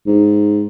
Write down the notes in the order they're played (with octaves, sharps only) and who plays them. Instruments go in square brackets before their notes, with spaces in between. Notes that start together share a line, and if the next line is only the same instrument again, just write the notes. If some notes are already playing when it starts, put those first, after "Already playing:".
[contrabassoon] G#2